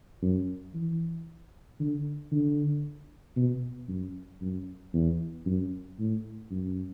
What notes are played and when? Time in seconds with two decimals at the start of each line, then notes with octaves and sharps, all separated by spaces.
0.22 F#2
0.74 E3
1.80 D3
2.32 D3
3.36 B2
3.89 F#2
4.41 F#2
4.94 E2
5.46 F#2
5.99 A2
6.51 F#2